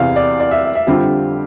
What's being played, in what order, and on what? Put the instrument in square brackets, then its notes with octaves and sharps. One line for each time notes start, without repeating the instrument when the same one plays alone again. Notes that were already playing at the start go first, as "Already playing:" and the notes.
Already playing: [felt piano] E2 C3 E3 [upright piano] F5
[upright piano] D5
D5
E5
E5
E5
[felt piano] F2 D3 G3 C4 F4 [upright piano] G4